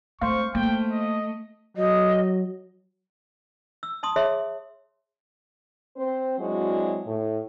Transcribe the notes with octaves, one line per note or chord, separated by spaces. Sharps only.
A3 C4 C5 F5 C#6
A3 A#3 G5
D#5
F#3 D#5
E6
A5 C6 D#6
G#4 C#5 E5 C6
C4 C5
F#3 G#3 C4 D4 E4 F#4
A2